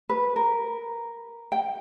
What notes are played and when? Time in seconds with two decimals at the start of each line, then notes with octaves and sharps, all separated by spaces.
0.09 B4
0.36 A#4
1.52 G5